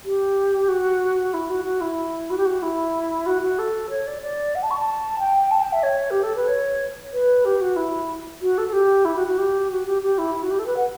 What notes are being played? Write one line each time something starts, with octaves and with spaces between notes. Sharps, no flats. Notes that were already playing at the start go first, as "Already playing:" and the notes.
G4
F#4
E4
F#4
F#4
E4
F#4
G4
F#4
E4
F#4
F#4
A4
C#5
D5
D5
F#5
A5
C#6
A5
G5
A5
G5
E5
C#5
G4
A4
B4
C#5
B4
G4
F#4
E4
F#4
A4
A4
G4
E4
F#4
F#4
G4
F#4
G4
G4
E4
E4
F#4
G4
A4
B4
F#5